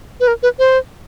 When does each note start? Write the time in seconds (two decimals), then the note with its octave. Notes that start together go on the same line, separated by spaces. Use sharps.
0.20 B4
0.28 A#4
0.43 B4
0.59 C5